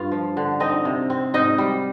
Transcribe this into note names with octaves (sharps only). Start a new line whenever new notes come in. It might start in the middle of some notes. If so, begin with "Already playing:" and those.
Already playing: G2 F4 F5
F3
D3
C4 D#4 D#5
C3
C4
G#2 D#4 D#5
G3